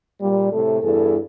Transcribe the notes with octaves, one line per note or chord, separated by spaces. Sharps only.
A#2 G3
A2 C3 A3
E2 G2 E4 G#4 A4